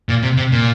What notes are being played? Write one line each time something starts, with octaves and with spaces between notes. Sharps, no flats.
A#2
C3
C3
A#2